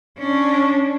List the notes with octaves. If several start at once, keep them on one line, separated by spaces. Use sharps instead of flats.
C#4 D4